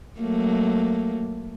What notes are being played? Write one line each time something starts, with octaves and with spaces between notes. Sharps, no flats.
F#3 A3 A#3